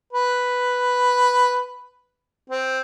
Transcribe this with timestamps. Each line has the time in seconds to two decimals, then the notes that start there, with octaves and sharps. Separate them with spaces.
0.13 B4
2.49 C4